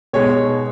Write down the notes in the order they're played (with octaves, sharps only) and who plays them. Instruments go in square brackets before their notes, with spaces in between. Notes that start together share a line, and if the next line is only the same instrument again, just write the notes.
[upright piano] B2 G#3 C#5